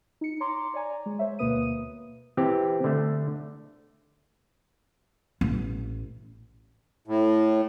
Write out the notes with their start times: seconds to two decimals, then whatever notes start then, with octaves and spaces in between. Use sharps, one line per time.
0.21 D#4 C#7
0.40 C#5 A#5 C6 D6
0.74 C#5 D5 G#5 A#5
1.06 G#3
1.19 C5 C#5 E5
1.39 D2 B2 A#3 B4 D#6 D#7
2.37 E3 C4 G4
2.84 D3 A3
5.41 A1
7.08 A2